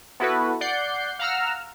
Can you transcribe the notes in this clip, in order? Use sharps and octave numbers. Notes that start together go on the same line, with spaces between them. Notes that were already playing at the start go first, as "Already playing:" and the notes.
B3 E4 F#4 A4 B4
D5 F#5 G6 C7
F5 F#5 A#5 E6 F6